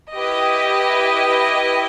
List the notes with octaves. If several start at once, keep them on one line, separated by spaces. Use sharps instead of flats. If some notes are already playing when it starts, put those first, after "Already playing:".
E4 G4 B4 D#5